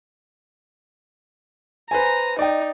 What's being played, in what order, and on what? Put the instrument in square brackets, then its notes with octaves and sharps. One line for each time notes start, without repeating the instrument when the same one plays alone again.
[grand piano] B4 C5 G#5 [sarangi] A#5
[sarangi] D#4 [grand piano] D5 D#5 G5